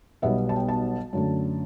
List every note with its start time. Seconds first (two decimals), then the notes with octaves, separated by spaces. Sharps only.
0.22 B1 B2 G3 B3 E5
0.49 A5
0.56 G5
0.68 A5
1.13 F#2 D3 A3